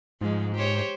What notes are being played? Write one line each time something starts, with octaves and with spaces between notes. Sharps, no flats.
G#2 F3 G#3
G4 C5 C#5